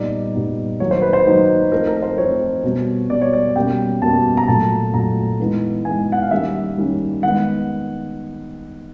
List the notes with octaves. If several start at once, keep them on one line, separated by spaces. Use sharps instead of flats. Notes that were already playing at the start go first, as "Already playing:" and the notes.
Already playing: A#2 G3 B3 D#4 D5
A#2 G3 B3 D#4
D#3 F#3 A#3 D#4 C#5
C5
B4
C5
D#3 F#3 A#3 D#4
F3 A3 C4 D#4 A#4
A#4
C5
F3 A3 C4 D#4 C#5
B2 G3 B3
B2 G3 B3 D5
C#5
D5
B2 G3 A#3 C#4 G5
B2 G3 A#3 C#4 A5
A#5
A#2 F#3 A3 A5
A#2 F#3 A3 A#5
E3 G#3 B3 D#4
E3 G#3 B3 D#4 G#5
F#5
F5
D#3 G3 A#3 C#4 E5
D#3 G3 A#3 C#4
D#3 G#3 B3 F#5